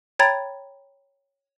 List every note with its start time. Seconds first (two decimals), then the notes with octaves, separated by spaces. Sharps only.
0.19 C#5 G5 A#5 B5 G#6 A6